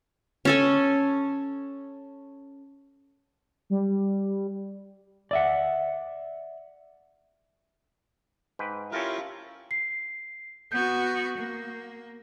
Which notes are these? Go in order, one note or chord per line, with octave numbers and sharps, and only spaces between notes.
C#4 A4 G#5
G3
D5 E5 F#5
G#2 B4 G5
C#4 E4 F4 G4 A4 A#4
C7
B3 F#4 G6
A#3